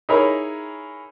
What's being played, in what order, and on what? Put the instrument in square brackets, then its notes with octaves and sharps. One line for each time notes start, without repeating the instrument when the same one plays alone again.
[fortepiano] D#4 E4 G#4 A#4 C#5 B5